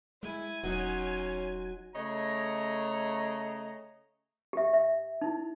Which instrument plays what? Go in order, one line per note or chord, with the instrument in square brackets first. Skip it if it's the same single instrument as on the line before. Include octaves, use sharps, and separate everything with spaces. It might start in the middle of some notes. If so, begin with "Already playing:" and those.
[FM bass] G#3 [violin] E4 [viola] G#5
[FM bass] E1 [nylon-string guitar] F#3 D#4 [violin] C#4 C6
[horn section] C#3 A3 C#5 D#5 A#5
[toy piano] G4 E5
E5
D#4 E4